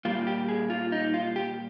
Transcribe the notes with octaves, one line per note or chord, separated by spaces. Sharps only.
A#2 G3 A#3 F4
G4
G#4
F4
D#4
F4
G4